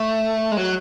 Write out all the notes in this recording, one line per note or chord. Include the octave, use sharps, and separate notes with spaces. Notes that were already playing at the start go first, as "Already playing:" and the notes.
Already playing: A3
G#3
F#3